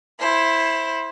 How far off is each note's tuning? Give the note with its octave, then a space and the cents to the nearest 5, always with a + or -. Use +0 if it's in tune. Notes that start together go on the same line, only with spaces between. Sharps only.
E4 +0 C5 +20